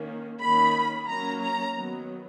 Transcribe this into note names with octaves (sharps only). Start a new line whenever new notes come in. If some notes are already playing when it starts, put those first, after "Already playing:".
Already playing: D#3 A#3 C#4
D#3 A#3 C#4 B5
F#3 A#3 C#4 A#5
A#5
D#3 F#3 B3